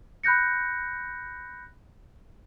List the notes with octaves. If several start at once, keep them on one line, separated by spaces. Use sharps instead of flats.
B5 F#6 G6 A#6 C#7